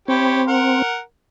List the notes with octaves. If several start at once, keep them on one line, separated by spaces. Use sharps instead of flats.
C4 E4 G4 C#5
A#4 F#5